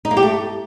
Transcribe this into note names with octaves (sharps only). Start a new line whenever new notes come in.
D#4
A#3
G4
A3